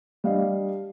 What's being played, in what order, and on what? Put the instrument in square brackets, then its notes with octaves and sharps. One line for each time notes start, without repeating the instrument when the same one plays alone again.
[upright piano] G3 D4 D#5 F5